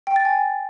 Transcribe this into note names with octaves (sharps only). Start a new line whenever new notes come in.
G5
A6
G#5